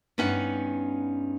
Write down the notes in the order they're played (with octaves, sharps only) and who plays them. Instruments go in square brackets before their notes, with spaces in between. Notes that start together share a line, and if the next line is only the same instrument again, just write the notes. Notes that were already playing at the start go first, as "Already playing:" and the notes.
[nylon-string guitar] G2 B3 C#4 D#4 F#5